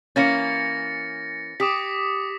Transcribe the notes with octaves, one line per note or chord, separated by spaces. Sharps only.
E3 A#3 C#4 A6 A#6 C#7
G4 D6 D#6 B6